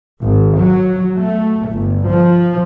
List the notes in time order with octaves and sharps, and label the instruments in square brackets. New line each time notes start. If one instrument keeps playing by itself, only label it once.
[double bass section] G#1
F#3
A3
G1
F3